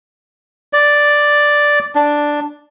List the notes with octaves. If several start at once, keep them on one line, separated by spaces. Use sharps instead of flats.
D5
D4